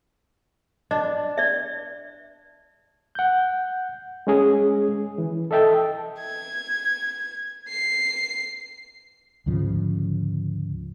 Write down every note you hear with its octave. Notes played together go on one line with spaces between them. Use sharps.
D4 D#5
D5 E5
F#5 G6
G#3 C#4 G#4
E3
A4 D#5 E5 G5 A5
G#6
C7
D2 G#2 C#3 F3